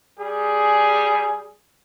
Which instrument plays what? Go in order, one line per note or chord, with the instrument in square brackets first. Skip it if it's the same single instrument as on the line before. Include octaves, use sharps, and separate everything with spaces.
[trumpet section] G3 G#4